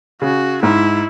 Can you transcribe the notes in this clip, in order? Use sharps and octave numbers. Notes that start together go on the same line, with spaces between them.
C#3 F#4
G#2 E4